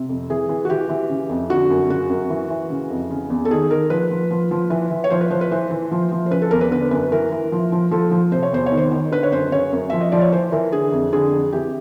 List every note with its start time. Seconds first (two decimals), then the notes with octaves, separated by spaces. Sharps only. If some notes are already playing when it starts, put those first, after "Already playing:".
Already playing: C3
0.09 F2
0.30 E3 G#4
0.49 E3
0.65 F#4
0.70 E3 G4
0.89 E3
1.10 C#3
1.29 F2
1.50 D3 F#4
1.70 F#2
1.90 C#3 F#4
2.10 F#2
2.30 E3
2.50 E3
2.70 C#3
2.90 F2
3.11 C#3
3.30 E2
3.45 A4
3.50 D#3 G#4
3.71 D#3 A#4
3.90 F3 B4
4.10 F3
4.31 F3
4.51 F3
4.70 E3 B4
4.91 E3
5.04 C#5
5.10 F3 C5
5.21 B4
5.31 F3 C5
5.41 B4
5.51 E3 C5
5.71 E3
5.91 F3
6.12 F3
6.26 C5
6.31 C#3 B4
6.42 A4
6.51 E2 A#4
6.61 B4
6.71 D3 B4
6.91 F#2 B4
7.12 E3 A#4
7.32 E3
7.52 F3
7.72 F3
7.91 F3 A4
8.11 F3
8.32 C3 C5
8.43 C#5
8.52 E2 C5
8.66 C#5
8.72 D#3
8.77 C5
8.92 D#3
9.12 D3 B4
9.23 C#5
9.32 F#2 C5
9.52 C#3 C#5
9.72 F#2
9.90 F3 E5
10.01 D#5
10.12 F3 D5
10.21 C#5
10.32 E3 C5
10.52 E3 A#4
10.72 D3 G#4
10.92 F2
11.13 D3 G#4
11.32 F2
11.53 E3 G4